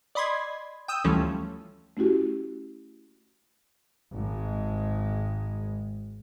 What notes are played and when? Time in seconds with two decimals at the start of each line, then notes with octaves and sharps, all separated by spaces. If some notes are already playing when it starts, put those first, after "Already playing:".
0.15 D5 D#5 B5 C6 G#6
0.88 G5 D#6 E6
1.04 D2 E3 F3 G3 A3 C#4
1.97 A3 C#4 E4 F#4 G4
4.12 G#1 G#3